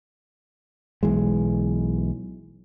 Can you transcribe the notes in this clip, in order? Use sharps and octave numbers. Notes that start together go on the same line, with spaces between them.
B1 E3 G#3